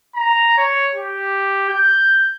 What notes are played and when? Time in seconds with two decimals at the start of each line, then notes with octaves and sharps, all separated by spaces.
0.15 A#5
0.57 C#5
0.95 G4
1.69 G6